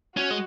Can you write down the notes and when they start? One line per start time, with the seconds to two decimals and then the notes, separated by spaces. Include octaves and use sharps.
0.16 C#4 F#4
0.31 G#3